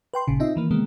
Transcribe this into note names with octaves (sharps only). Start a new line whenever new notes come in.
B4 G5 C6
G#1 A#2 C#3
C4 D#4 F4 D#5 E5
D#3 E3 A#3
C3 D#3 G#3 A#3 B3